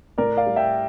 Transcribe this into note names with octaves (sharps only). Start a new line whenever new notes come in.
A2 A#4 D5
D5 F5
G3
E5 G5